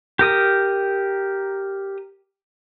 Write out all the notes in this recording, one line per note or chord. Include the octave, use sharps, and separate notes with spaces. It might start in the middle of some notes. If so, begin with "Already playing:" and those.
G4 A#4 D#6